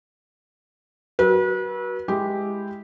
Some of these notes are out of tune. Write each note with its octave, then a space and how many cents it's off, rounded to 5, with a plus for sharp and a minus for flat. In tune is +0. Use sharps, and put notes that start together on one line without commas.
F#3 +15 B4 -35
G#3 +0 E4 +0 G4 +0